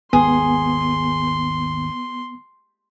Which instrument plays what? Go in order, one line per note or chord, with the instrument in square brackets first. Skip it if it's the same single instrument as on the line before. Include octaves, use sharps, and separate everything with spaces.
[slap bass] G#1 D#2 [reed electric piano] B3 [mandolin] G#4 [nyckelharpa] C6